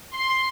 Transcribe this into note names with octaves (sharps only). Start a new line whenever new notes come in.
C6